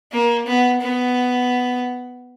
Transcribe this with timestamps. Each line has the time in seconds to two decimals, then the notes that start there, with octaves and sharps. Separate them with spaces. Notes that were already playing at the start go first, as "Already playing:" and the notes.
0.12 A#3
0.46 B3
0.81 B3